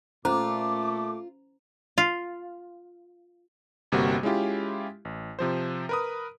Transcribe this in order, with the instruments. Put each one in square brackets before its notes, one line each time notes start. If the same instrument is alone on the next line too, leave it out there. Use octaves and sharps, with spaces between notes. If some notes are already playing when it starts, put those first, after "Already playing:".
[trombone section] A#2 A3 [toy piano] C#4 C5 A#5 [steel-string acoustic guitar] F4 [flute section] D6
[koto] F4
[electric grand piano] G1 C3 G3 A#3 F#4
G#3 C#4 E4 F4 G4
A1
C3 F3 C5
A#4 B4 D#6